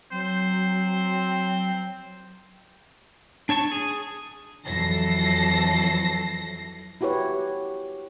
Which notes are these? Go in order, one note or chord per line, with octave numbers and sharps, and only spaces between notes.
F#3 C4 C5
D4 C#5 A5 C#6
G#4
F2 E3 F#3 A4 A#6 C7
E4 F#4 G4 B4 C#5